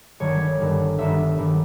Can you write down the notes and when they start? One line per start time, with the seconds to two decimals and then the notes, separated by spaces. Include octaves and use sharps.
0.20 G1 G2 D#3 G3 C#5
0.59 G1 G2 D#3 G3
0.99 G1 G2 D#3 G3 E5
1.38 G1 G2 D#3 G3